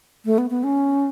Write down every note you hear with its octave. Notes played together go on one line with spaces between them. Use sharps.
A3
B3
B3
C#4